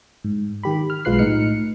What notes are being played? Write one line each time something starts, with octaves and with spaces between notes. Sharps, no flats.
G#2
D#3 G4 B5
F6
B1 G#3 F4 B4 F#6 C7
A2 D#4 F6 C#7